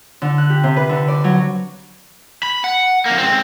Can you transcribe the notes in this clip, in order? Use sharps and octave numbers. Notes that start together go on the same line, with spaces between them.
D3
F#6
G4
C3
B4
D3
D5
F#3
B5
F#5
F2 A#3
C#2 C4